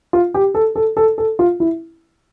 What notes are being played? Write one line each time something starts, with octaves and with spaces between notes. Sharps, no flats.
F4
G4
A4
A4
A4
A4
F4
E4